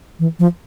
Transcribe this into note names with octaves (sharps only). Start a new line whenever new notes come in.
E3
F3